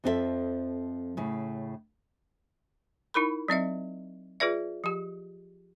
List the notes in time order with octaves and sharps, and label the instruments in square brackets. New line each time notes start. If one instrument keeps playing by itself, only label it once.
[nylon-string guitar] F2 F3 C4 F4 A4 E5
A2 C#3
[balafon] D#4 E4 A#4 B5
F#3 C4 D#5 E5
F4 G#4 B4 D5 E5
F3 G4